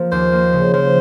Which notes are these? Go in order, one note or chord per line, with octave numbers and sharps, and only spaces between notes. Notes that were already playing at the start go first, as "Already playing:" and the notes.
Already playing: F3 A#3
D#2 C5
A#3
C#3
F3 C5